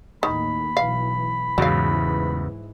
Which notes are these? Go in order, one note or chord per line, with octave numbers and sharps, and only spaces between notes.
D#2 A2 D#3 B5
B1 E3 F5
E2 G#2 C#3 E3 F#3 F5